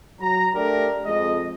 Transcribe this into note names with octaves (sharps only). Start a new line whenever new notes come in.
F#3 A#5
A3 D4 G4 A#4
F2 G#3 D#5